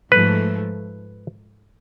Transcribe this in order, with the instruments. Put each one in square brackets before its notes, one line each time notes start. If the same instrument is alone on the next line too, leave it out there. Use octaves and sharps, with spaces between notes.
[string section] G#2 F3 A3 [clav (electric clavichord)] B4